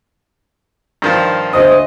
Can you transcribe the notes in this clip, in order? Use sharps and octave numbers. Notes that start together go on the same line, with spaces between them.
G2 D#3 F3
D2 C5 D#5 D#6